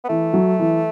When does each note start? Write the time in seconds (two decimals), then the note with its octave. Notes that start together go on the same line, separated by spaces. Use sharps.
0.04 B3
0.09 E3 A3
0.33 F#3
0.59 E3